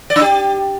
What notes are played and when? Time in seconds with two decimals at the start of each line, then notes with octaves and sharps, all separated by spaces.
0.10 D5
0.16 D4
0.21 G4